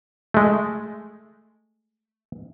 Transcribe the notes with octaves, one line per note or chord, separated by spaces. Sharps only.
G#3 A3